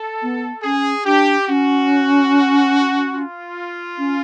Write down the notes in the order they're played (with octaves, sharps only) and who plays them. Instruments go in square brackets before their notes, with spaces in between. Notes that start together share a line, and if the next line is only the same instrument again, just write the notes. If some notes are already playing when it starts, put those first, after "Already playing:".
Already playing: [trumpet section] A4
[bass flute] B3
[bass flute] C#4 [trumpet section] G#4
[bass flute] D4 [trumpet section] G4
[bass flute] C#4 [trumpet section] F#4
[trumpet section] F4
[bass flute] C#4